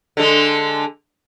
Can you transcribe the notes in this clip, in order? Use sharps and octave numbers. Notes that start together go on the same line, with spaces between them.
D3 G#3